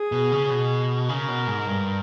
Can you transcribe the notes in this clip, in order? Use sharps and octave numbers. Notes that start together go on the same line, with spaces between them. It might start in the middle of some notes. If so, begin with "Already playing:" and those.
Already playing: G#4
B2
C#3
B2
C#3 A#4
B2
G#2
G2